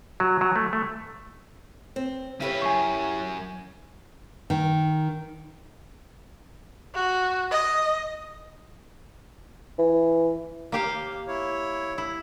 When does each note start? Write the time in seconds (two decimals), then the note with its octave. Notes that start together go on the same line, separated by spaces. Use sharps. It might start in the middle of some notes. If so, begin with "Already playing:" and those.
0.20 F#3
0.41 F#3
0.56 A3
0.73 A3
1.96 C4
2.40 C#3 E4 G4 B4 C#5
2.62 F#2 G#5 C#6
4.50 D#3
6.94 F#4
7.51 D#5
9.78 E3
10.72 D#2 A#3 G4 F5
11.28 E4 C#5
11.98 E4